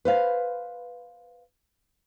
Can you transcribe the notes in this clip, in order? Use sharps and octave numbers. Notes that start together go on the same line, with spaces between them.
B4 C5 F5